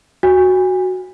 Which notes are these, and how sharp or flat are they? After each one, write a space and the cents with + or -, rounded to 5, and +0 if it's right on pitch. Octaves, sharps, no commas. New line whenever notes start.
F#4 +0 G#5 -35